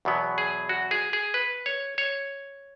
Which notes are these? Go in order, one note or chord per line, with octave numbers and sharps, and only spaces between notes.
E2 B2 F#3 B3
G#4
F#4
G#4
G#4
B4
C#5
C#5